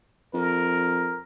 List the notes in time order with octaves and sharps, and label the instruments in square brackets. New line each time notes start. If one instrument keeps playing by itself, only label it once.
[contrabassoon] F2 [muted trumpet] A#4